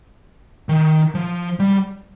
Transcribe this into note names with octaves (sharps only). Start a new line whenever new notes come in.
D#3
F3
G3